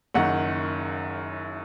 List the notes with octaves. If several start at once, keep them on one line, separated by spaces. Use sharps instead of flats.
F#1 F#2 D#3 F#5